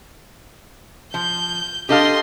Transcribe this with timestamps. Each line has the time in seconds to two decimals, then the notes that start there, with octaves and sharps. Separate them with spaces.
1.14 F3 G6
1.89 D4 G4 A4 D#5 F5 C6